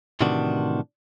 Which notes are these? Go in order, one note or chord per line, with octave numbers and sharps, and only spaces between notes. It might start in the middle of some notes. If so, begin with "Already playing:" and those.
A2 C3 D#3 E3 D4 F#4